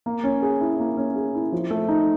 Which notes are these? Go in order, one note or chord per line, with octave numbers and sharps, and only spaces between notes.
A#3
C#4
G#4
E4
A#3
C#4
G#4
E4
F3
A3
D#4